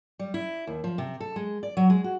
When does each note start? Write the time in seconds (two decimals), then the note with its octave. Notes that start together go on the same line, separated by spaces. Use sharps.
0.19 G3
0.34 E4
0.67 D#2
0.84 F3
0.98 C3
1.20 A4
1.36 G#3
1.63 D5
1.77 F#3
1.90 G#3
2.04 F#4